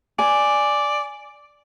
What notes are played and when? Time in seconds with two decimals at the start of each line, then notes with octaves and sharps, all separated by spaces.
0.19 D5 G#5